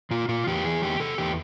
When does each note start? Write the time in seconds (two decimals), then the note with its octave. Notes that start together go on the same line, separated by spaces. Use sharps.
0.11 A#2 F4
0.28 A#2 F4
0.47 E2 G4
0.64 E3 G#4
0.82 E2 G4
1.00 C3 A4
1.18 E2 G4